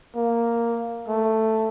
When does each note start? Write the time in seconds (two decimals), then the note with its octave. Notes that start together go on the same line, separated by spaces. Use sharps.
0.16 A#3
1.08 A3